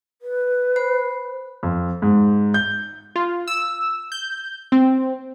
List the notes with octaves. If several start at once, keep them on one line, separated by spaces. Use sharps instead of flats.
B4
C5 B5
F2
G#2
G6
F4
E6
G6
C4